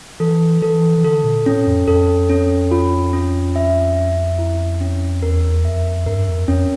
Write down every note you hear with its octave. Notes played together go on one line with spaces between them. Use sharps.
E3 A4
E3 A4
E3
D3 A4
A#2
A2 C#4
F2
F2 A4
C#4
F4
C#4
E5
E5
E4
C#4
E2 A#4
F2 E5
G2 A#4
F2
F2 C#4